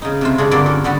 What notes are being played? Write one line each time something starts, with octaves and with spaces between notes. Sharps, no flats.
C#3 D#4
C3 A3 F4
C#3 G#3 C#4 D4 A4
G2 A#2 D3 A#3 A#4 D5
C#4 A4
D3 G3 B3 F#4